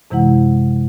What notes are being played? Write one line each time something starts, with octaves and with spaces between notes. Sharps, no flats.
F#2 C3 E3 G#3 E4 F#5